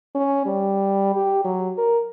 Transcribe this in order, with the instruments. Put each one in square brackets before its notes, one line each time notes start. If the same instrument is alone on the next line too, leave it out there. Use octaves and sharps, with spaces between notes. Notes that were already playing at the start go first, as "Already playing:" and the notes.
[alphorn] C#4
G3
G4
F#3
A#4